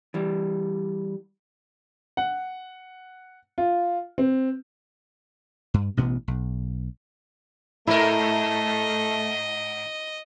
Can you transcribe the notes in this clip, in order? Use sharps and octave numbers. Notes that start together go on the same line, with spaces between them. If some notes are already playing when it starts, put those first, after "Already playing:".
E3 G3
F#5
F4
C4
G2
A1 B2 B3
B1
G#2 A3 E4 A#4 D#5